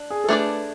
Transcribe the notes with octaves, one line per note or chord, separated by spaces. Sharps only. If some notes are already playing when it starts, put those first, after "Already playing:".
Already playing: D4
G#4
A4
A3 D4 G#4 B4 D5